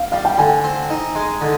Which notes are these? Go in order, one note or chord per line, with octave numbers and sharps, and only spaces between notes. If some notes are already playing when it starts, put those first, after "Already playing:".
Already playing: F5
G3 F5
G5
D3 G#5
C4
D#4
G#3
D3